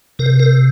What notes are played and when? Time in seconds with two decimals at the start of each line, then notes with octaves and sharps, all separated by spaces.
0.19 C3 A#4
0.40 A#4